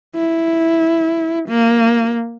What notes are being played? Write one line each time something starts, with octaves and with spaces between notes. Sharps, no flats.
E4
A#3